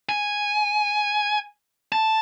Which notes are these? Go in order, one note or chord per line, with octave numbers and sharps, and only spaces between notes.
G#5
A5